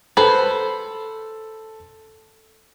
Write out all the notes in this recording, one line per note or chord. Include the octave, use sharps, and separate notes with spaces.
A4 B4 C5